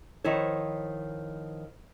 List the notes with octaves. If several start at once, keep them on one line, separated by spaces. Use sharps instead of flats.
D#3 F3 E4 C5 C#5